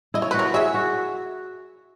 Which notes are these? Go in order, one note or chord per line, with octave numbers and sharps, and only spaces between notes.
E4 D#5
C#5
F#4 B4
A#4 C#5
G#4 C#5 E5
F#4